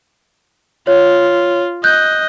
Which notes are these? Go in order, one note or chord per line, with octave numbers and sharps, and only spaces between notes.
F4 C#5
D#5 F#6 G6